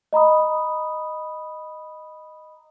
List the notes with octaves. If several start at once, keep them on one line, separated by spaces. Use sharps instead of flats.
D#5 A#5 B5 D#6